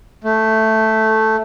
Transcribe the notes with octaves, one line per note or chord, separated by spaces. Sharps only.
A3